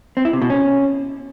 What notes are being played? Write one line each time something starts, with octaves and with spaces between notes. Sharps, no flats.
C4
E4
C3
B2
C#4